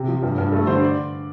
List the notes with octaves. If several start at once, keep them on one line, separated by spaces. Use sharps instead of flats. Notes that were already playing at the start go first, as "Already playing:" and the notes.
Already playing: C3
F3
G2
G2
A3 A4
D3 C5
D5